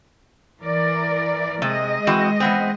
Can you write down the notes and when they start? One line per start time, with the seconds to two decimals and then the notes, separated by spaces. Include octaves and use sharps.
0.61 E3 A#4 D5
1.62 C3 G#3 D#5
2.07 E3 C4 F#4
2.40 E3 B3 C4